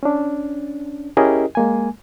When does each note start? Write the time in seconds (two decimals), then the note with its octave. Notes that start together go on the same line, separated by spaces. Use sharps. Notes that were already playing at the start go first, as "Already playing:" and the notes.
0.03 C#4 D4
1.17 C#4 E4 G4 G#4 A#4 D#5
1.55 G#3 A#3 G#5